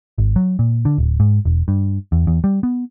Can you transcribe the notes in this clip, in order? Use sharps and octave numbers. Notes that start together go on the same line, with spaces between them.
G#1
F#3
A#2
D3
D1
G#2
E1
G2
E2
E2
G3
B3